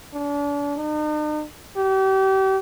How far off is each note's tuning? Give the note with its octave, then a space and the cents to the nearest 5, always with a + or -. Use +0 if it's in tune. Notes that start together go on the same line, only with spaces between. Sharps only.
D4 -35
D#4 -45
G4 -35